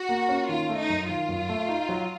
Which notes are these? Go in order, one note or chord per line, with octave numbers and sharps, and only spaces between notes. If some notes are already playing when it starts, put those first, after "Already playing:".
Already playing: F#4
A#3
C#4
D#3 F4
A3
D#4
F#2
D#3 F4
F#2
A3
D#4
F#3